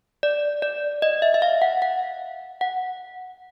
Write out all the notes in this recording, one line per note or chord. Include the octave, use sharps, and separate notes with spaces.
D5
D5
D#5
E5
E5
F5
F#5
F#5
F#5